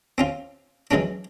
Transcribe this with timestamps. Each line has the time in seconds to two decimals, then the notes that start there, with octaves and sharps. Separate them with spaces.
0.18 C4 C#4 F4
0.91 E3 F#3 G#3 C#4 D4